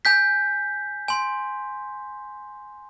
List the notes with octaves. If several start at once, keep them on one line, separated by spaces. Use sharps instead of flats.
G#5 G6 B6
G#5 C6